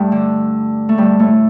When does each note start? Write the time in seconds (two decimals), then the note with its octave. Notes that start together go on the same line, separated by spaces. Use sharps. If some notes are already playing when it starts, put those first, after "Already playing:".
Already playing: G2 G3 A3
0.12 D3
0.89 A3
0.98 G2 G3
1.19 A2 A3